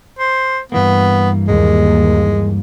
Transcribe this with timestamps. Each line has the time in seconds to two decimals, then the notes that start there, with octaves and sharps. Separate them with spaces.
0.19 C5
0.72 G2 E3 A#3 B3
1.48 D#2 G#3